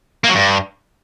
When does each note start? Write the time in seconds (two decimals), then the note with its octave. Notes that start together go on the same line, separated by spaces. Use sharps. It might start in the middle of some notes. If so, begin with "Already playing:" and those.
0.24 A#3
0.29 F#3
0.35 G2